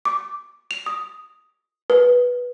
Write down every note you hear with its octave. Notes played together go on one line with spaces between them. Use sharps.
D6
F7
D#6
B4